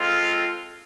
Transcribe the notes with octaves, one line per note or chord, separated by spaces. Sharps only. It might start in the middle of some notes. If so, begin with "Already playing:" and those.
Already playing: G#3 C4 F4 A4